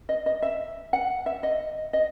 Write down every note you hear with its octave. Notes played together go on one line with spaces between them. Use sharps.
D#5
D#5
E5
F#5
E5
D#5
D#5